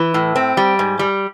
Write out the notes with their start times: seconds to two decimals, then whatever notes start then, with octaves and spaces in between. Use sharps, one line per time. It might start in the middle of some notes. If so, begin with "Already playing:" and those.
Already playing: E3
0.14 A2
0.35 C4
0.57 G3
0.79 G#2
0.99 G3